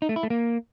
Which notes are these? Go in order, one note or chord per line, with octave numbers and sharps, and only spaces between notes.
D#4
A3
E4
A3
A#3